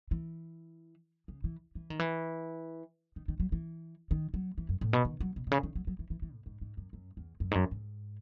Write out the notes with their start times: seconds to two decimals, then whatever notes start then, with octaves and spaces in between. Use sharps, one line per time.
0.11 E3
1.28 C#3
1.44 E3
1.75 E3
1.90 D#3
1.99 E3
3.16 D#3
3.28 D#3
3.40 F#3
3.52 E3
4.11 D#3
4.34 F#3
4.58 E3
4.69 F#2
4.81 A2
4.93 B2
5.05 D#3
5.20 F#3
5.36 B2
5.47 B2
5.51 C#3
5.63 D#3
5.75 F#3
5.87 F#3
5.99 E3
6.10 E3
6.22 E3
6.34 A2
6.46 G#2
6.61 G#2
6.77 F#2
6.93 F#2
7.17 E2
7.40 F#2
7.51 G#2
7.55 F#2
7.71 G#2